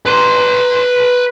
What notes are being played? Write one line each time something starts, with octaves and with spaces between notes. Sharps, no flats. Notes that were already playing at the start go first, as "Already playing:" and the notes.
B4 C6